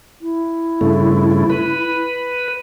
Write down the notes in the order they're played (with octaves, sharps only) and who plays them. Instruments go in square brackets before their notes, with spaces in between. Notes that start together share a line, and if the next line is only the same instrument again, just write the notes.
[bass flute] E4
[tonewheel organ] G2 C#3 A3
B4